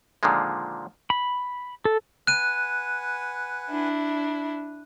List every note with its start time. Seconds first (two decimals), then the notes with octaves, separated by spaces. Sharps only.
0.23 A#2 D3 D#3 F3 G#3
1.10 B5
1.85 A4
2.27 B4 F#5 G#5 F#6 D#7
3.68 D4 E4